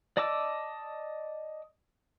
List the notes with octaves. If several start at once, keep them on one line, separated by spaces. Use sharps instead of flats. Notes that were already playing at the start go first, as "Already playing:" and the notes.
D5 D#5 A5 D6 E6